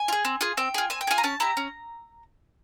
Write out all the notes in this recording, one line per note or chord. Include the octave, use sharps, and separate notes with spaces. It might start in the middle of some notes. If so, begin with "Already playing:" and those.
Already playing: G#5
F4
G#4
C4
F4 G#4
C4 G5
F4 G#4
C4 G#5
G5
F4 G#4 G#5
A#5
C#4 A5
E4 G4 A#5
C#4